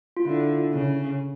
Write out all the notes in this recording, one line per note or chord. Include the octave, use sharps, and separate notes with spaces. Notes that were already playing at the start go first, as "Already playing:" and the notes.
F4
D3 E4
C#3